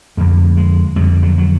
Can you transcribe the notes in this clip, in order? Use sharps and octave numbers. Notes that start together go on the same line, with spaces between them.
F2 D3 A3
G#3
F2 D3 G3
F#3
F#3